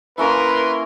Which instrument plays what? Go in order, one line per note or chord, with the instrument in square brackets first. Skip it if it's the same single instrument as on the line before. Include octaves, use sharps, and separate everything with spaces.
[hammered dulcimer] A#3 C#4 E4 [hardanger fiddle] A#4 C6 [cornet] B4